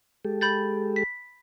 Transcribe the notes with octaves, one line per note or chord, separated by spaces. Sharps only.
G#3 G4 A4
B5 G6 A6
B6